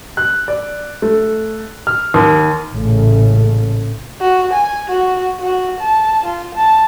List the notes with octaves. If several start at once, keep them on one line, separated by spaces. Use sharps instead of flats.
F#6
D5
A3
F6
D#2
A1 A#2 C#3 A3
F#4
G#5
F#4
F#4
A5
F4
A5